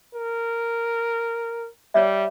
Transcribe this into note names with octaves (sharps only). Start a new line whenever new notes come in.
A#4
G3 C#5 D5 E5